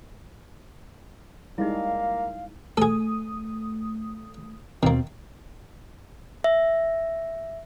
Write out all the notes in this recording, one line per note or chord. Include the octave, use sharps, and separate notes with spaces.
G3 G#3 A#3 D#4 E4 F5
A3 G#4 A4 D#6
D#2 B2 D#3 A#3 C4
E5